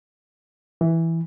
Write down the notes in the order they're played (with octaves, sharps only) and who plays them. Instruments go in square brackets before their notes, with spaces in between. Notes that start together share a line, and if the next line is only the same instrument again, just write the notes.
[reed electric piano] E3